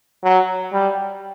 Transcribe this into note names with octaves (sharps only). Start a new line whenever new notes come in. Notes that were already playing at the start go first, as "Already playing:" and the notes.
F#3
G3